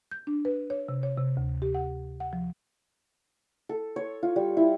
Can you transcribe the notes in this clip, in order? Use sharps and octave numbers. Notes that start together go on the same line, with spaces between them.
G6
D4
B4
C#5
C3
C#5
C3
D2
G4
F#5
F#5
F3
A4
C#5
F4
G3
E4